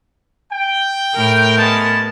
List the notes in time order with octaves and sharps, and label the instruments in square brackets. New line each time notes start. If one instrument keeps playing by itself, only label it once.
[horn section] G5
[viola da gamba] A2 A#4
[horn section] G#3 B3 A5